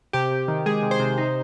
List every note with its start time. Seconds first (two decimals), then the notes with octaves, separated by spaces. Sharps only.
0.13 C3 G4
0.31 C3
0.48 D#3
0.66 G#3 G#4
0.83 C3
0.91 C5
1.00 C3
1.18 D#4